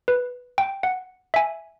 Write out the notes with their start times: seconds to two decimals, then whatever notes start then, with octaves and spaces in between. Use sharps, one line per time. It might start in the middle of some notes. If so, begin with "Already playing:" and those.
0.08 B4
0.58 G5
0.83 F#5
1.34 E5 G#5